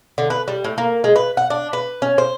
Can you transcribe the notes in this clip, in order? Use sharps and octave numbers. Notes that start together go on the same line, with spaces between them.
D3
B4
G3
A2
A#3
G#3
B4
F#5
D4
B4
C#4
C5